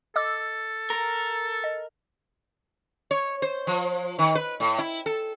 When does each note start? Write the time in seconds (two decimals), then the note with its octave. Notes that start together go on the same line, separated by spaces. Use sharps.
0.16 A4 D#5 D6 E6
0.90 A#4
1.64 D#5
3.11 C#5
3.42 C5
3.67 F3
4.19 D#3
4.35 B4
4.60 A2
4.79 E4
5.06 A4